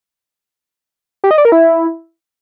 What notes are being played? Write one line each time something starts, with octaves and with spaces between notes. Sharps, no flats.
G4
D#5
D5
A#4
E4